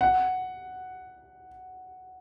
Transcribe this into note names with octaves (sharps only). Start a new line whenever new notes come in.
F#5